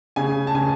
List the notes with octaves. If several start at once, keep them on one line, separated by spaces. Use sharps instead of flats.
C#3 G#5
A5
C#3 G#5